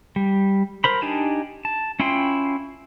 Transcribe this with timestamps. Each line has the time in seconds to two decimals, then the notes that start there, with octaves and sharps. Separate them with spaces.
0.16 G3
0.84 A#4 C5 B5
1.02 D4 D#4 G4 G#5 A5
1.65 A5
2.00 C#4 E4 F4 G5 C6